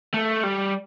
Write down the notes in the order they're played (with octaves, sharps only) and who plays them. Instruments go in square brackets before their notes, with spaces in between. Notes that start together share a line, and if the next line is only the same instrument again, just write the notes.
[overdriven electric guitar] A3
G3